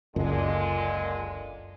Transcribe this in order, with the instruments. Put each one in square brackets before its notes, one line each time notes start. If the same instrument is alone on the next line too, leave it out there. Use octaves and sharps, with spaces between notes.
[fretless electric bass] F#1 C#2 F#2 [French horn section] A#2 D3 G#3